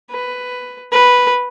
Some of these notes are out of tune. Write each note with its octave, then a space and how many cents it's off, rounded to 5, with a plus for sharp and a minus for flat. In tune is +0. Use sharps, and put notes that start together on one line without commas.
B4 +10
B4 -5